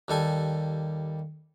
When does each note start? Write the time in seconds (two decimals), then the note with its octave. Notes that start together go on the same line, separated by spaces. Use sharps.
0.08 D#2 G3 A4 G#5